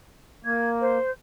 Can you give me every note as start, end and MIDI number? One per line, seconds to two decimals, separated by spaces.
0.45 0.98 58
0.45 0.69 92
0.81 1.10 72